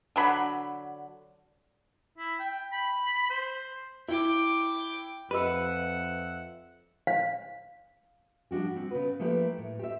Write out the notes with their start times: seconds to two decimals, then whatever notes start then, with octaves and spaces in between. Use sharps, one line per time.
0.16 D3 F#3 B5
2.18 E4
2.39 G5
2.72 B5
3.30 C5
4.08 E4 G5 D6
5.31 F2 G4 B4 D#5 E5 F#5 E6
7.07 F5
8.51 F3 G3 D4 F#4 G4
8.76 C4 F#4
8.91 C#3 B3 B4
9.20 F3 A3 A#3 E4 G4 B4
9.58 A2
9.79 G4 C5 E5